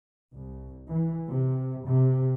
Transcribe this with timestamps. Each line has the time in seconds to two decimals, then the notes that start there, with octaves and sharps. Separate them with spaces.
0.33 C2
0.89 E3
1.31 C3
1.85 C3